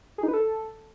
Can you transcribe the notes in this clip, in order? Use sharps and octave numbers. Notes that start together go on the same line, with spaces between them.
G#4
D#4
B4
A4